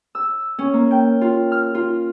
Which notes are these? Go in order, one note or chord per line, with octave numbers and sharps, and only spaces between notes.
E6
C#4
A#3
G5
F4
F6
F4